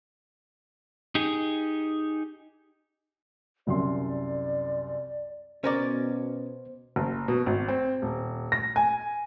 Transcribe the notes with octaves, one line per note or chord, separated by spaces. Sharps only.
D#4 G4 G#4
C2 F#2 D5 C6
B2 C#4 A#4 C5 D5
F#1
B2
G#1
C4
D#1
A#6
G#5